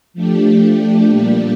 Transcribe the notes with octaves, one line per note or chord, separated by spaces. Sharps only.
F3 A3 D4 G4
A#2 G3 A#3 D4 G4